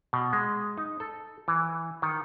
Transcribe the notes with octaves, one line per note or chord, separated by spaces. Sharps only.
B2
G#3
D#4
A4
E3
D#3